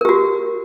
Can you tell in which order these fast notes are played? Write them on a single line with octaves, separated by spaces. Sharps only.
A#4 G4 F#4